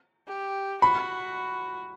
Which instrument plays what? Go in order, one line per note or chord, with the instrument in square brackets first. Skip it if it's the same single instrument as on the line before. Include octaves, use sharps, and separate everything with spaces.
[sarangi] G4
[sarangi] F#4 [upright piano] B5